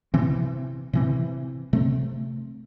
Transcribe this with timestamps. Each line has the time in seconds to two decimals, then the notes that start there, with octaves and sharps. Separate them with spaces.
0.14 C3 E3 C4
0.93 C3 E3 C4
1.73 C3 A3 C4